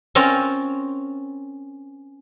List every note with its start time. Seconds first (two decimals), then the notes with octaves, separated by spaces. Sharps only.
0.15 C4 C#4 F4 A#4